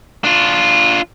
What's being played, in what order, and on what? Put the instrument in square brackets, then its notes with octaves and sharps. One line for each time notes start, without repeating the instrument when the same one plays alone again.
[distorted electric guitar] D4 F4